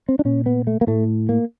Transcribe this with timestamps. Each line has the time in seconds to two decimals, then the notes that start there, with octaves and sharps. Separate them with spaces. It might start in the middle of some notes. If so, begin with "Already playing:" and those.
0.09 C4
0.19 D4
0.25 A#2 C#4
0.46 B3
0.67 A3
0.81 A#3
0.87 A2 A3
1.29 A#3